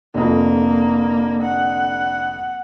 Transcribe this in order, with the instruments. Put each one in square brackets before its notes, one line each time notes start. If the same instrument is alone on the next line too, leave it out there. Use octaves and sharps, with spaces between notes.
[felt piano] F1 F2 [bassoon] D3 [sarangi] A#3
[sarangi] F#5